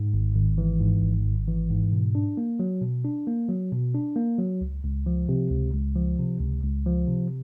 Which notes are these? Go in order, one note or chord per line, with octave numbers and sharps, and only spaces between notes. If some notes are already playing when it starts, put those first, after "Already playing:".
Already playing: G#2
G#1
G#1
E3
G#2
G#1
G#1
E3
G#2
B2
D4
A#3
F#3
B2
D4
A#3
F#3
B2
D4
A#3
F#3
C#2
C#2
F3
C3
C#2
C#2
F3
C3
C#2
C#2
F3
C3